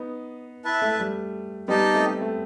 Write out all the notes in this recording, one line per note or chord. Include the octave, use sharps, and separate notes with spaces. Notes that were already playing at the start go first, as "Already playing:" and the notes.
Already playing: B3 D#4
E4 B4 E5 A5
A3
G3
G3 B3 D#4 G4 D#5 A5
A3 C4
A3